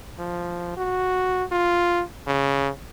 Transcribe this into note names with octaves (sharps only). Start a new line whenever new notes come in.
F3
F#4
F4
C#3